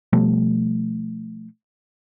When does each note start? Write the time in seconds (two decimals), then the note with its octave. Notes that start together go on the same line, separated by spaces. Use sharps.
0.13 B2 F3 G3 A3